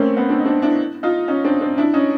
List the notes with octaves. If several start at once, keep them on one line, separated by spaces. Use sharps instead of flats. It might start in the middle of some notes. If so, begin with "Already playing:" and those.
Already playing: A3 A#3 C4 C#4
B3 C#4
C4 D4
D#4
C4 D4
D4 E4
D#4 F4
C#4 D#4
C4 D4
C4 D4
D4 E4
C#4 D#4